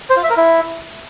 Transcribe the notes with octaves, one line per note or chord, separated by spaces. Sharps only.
C5
F4
E5
A#4
E4